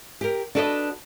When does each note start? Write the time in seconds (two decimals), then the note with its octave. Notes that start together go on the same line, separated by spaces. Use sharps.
0.21 G4 A#4
0.55 D4 F#4 A4 B4 C#5 D#5